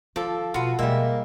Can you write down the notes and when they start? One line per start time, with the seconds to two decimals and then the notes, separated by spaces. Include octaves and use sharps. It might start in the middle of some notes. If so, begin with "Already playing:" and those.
0.16 D#3 F3 A4 D6
0.54 B2 F4 F#4 B4
0.79 B2 F3 G3 G#3 A#3 E5